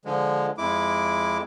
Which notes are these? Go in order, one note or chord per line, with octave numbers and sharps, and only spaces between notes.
D3 F3 G#3
F2 G#3 E4 D6